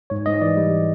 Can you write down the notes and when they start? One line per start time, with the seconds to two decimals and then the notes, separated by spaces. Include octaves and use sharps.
0.10 G#2 C#5
0.26 G#2 D#5
0.42 E3 D5
0.57 G3